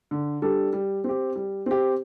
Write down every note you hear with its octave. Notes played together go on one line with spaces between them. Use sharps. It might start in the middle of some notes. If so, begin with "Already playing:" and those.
D3
G3 D4 A4
G3
C4 G4
G3
C4 G4